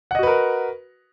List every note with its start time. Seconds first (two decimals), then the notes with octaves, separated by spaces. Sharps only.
0.11 F#5
0.15 D#5
0.19 F#4
0.23 B4
0.27 A#4